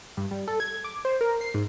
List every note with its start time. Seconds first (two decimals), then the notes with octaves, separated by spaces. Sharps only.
0.17 G2
0.31 G3
0.48 A4
0.60 G#6
0.84 D6
1.05 C5
1.21 A#4
1.41 C7
1.54 G#2